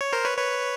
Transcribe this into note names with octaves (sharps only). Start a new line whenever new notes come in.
C#5
A#4 C5
B4 C#5
B4 C#5